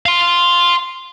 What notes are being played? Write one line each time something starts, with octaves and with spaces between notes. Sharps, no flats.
F5 C6